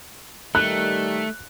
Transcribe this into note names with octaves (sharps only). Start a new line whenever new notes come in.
D#3 G3 A3 F#6